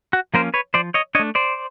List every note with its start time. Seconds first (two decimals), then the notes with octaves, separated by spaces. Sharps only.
0.13 F#4
0.34 F3 A#3 C#4 A#4 C5
0.54 B4 C#5
0.74 F3 C5 D5
0.94 C#5 D#5
1.15 D4 C#5 D#5
1.19 A3
1.35 C5 D5